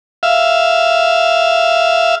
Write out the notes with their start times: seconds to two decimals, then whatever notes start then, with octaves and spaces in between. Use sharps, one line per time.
0.23 E5 F5